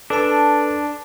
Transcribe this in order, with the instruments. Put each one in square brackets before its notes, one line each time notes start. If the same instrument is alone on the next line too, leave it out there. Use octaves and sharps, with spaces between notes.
[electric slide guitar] D4 [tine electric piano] A4 B4 A5